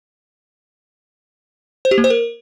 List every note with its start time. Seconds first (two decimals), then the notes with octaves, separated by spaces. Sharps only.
1.85 C5
1.91 G4
1.98 A#3
2.04 C5
2.10 A#4